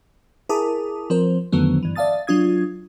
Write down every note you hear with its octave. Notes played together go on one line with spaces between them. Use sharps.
E4 G#4 A#4 A5 D6 D#6
F3 C4 A#4 C5
F2 D3 D#3 F#3 A3 B3
G2 E3
D5 E5 F5 A5 D#6 A6
F#3 D4 F4 D#6 G#6